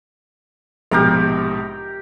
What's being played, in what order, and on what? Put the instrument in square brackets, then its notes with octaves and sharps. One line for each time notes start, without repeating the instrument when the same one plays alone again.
[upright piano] A#1 G#2 B2 [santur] G4 A#4 F5